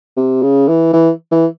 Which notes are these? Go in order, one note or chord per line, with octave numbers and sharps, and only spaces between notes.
C3
C#3
E3
E3
E3